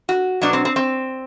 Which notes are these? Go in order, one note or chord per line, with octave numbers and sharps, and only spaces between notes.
F#4
B2 F#3 D4
C4
C4
C4